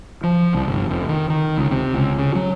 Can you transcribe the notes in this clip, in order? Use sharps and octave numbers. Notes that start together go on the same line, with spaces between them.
F3
C2
G1
F1
D#3
D#3
C#2
C3
C#2
C#3
F#3